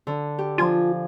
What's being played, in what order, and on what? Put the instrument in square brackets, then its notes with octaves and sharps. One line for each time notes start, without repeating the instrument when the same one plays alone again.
[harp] D3
G4
[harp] F3 D4 G#5 [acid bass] F4